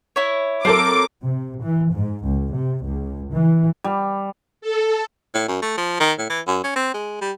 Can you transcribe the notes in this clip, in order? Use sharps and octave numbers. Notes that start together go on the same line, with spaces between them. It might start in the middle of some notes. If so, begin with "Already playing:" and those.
E4 C#5
F#3 C4 A4 A#4 D6
C3
E3
G#2
C#2
C3
C#2
E3
G3
A4
A2
F#2
A3
F3
D#3
A2
E3
F#2
C#4
C4
G#3
G3